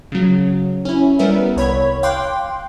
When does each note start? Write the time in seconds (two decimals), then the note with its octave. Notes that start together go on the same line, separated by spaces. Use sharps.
0.12 C#3 F#3
0.85 C#4 E4
1.19 G3 B3 A#4 E5
1.56 C2 C#5 B5 G#6
2.03 F5 G5 C6 D6 F#6